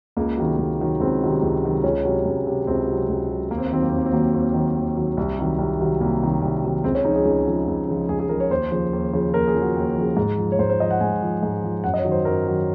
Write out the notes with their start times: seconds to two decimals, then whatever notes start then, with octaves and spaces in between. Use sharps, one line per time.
0.17 C#2 A#3
0.37 C3 D#3 F#3
0.59 C#2
0.80 C3 D#3 F#3
1.00 C#2 C4
1.21 C3 D#3 F#3
1.42 C#2
1.63 C3 D#3 F#3
1.84 C#2 C#4
2.05 C3 F#3
2.25 C#2
2.47 C3 F#3
2.67 C#2 C4
2.87 C3
2.93 F#3
3.09 C#2
3.29 C3 F#3
3.51 D#2 A#3
3.58 C4
3.67 A#3
3.71 D#3 F#3 C4
3.82 A#3
3.89 D#2 C4
3.98 A#3
4.06 C4
4.12 D#3 F#3 A#3
4.33 D#2 C4
4.54 D#3 F#3
4.76 D#2
4.97 D#3 F#3
5.17 C2
5.39 C3 D#3 F#3
5.58 C2
5.79 C3 D#3 F#3
6.00 C2 A#3
6.21 C3 D#3 F#3
6.42 C2
6.64 C3 D#3 F#3
6.84 C#2 C4
6.95 C#4
7.05 C#3 F3 D#4
7.16 G#4
7.25 C#2
7.46 C#3 F3
7.68 C#2
7.88 C#3 F3
8.09 C#2 G#4
8.19 G#4
8.29 C#3 F3 A#4
8.40 C#5
8.50 D#2 C5
8.71 C#3 F3
8.93 D#2
9.13 C#3 F3
9.34 D#2 A#4
9.47 G#4
9.54 C#3 F3
9.62 F#4
9.76 D#2
9.97 C#3 F3
10.17 G#2
10.38 F3
10.52 C#5
10.59 G#2 C5
10.70 C5
10.80 F3 D#5
10.91 F#5
11.01 G#2 G#5
11.22 F3
11.43 G#2
11.64 F3
11.84 F#2 F#5
11.94 D#5
11.98 C#5
12.04 D#3 F#3
12.12 C5
12.25 F#2 A#4
12.47 D#3 F#3